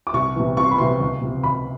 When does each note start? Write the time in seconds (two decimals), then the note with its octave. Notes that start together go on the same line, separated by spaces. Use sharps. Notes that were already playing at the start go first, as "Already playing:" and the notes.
0.07 D6
0.14 C2 C#6
0.35 C3 E3
0.57 C2 C#6
0.64 C6
0.71 B5
0.78 C3 E3 C6
1.01 C#2
1.21 C3 F3
1.43 C#2 B5